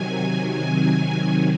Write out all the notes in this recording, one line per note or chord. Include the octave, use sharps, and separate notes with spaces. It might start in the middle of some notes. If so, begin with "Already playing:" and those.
Already playing: C3 D#3 F#3 G#5
G#5